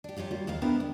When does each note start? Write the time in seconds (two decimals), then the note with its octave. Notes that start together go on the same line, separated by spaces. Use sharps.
0.04 D4 G4
0.16 F#3 G3 C#4 F4 G4
0.31 D#3 G3 A#3 F4
0.47 D#2 G#3 F4 F5
0.62 B3 C4 D4 E4 G4 A#4
0.80 D2